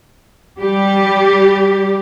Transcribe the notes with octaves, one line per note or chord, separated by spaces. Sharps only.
G3 G4